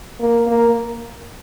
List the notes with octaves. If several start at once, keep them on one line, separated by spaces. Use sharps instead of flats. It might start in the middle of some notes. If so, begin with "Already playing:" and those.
A#3
A#3